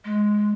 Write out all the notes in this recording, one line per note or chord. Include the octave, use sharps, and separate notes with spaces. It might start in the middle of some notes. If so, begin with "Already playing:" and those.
G#3